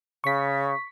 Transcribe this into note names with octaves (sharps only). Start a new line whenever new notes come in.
C#3 C#6 B6